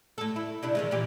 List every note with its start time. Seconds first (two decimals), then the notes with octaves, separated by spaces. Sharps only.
0.18 A2 A4
0.36 E4
0.63 C3 D4 E4
0.75 D#3 E3 G#3
0.91 A#2 E3 G4